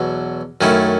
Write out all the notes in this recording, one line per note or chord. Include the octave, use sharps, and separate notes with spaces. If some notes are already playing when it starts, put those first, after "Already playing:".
Already playing: E2 B2 F#3
F#2 D#3 A3 C#4 E4